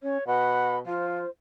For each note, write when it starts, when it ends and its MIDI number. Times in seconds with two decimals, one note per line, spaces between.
0.03 0.18 61
0.03 0.27 73
0.27 0.80 47
0.27 0.74 78
0.27 0.79 83
0.86 1.20 53
0.86 1.25 65
0.86 1.29 72